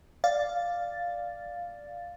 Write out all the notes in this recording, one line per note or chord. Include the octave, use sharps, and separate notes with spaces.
D5 F5 A6